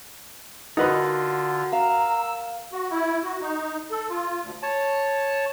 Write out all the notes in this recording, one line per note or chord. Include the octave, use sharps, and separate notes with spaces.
D3 D#4 F4 F#4 A#4 B4 D#5
F5 A#5 E6
F#4
E4
F#4
D#4
A4
F4
D2
C#5 A5